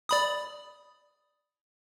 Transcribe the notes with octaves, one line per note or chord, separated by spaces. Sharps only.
D5 B5 D#6